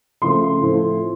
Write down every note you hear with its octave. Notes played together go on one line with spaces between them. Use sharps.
C#3 F3 A3 C4 C6
A2 F3 A3 C4